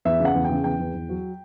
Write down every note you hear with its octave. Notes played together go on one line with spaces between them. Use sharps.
E2 E5
C#3 F#5
E2
G5
C#3
E2 G5
E2
E2
F#3